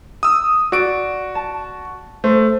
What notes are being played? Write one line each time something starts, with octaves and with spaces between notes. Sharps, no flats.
D#6 E6
F#4 D5 D7
A5
A3 C5